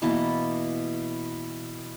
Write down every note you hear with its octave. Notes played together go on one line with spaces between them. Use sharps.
B2 E3 A#3 A5